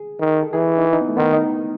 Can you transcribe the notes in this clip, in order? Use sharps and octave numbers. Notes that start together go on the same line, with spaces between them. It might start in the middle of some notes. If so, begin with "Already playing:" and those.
Already playing: G#4
D#3
A4
E3 G#4
D#4
E4
D#4
B3
A3
D#3 B3
D#4